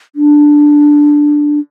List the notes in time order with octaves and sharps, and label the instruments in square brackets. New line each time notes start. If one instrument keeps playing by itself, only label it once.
[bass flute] D4